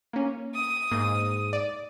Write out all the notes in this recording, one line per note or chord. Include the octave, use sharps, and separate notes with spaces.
A#3 C#4
D#6
G#2 A#3 D#7
D5